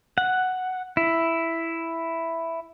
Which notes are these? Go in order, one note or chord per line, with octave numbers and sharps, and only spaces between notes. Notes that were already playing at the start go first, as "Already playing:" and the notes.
F#5
E4